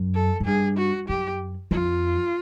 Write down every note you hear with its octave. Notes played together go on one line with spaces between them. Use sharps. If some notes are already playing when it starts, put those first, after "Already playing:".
Already playing: F#2
A4
G#2
G2 G#4
F#4
F#2 G4
F2 F4